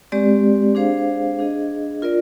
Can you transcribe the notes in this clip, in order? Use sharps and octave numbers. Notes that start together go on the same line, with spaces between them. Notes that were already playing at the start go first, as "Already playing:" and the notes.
G#3 C4 G4 D5
D4 G#4 C5 F5
D4 G#4 D#5
F4 A#4 D5